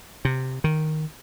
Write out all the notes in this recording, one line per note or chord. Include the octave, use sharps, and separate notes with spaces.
C3
D#3